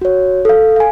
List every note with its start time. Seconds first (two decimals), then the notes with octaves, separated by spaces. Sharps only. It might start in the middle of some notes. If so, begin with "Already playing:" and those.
0.01 F#4 C#5
0.45 A4 F5
0.76 F5 G#5